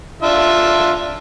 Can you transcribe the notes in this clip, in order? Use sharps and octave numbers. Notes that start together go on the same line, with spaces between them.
D4 F4 E5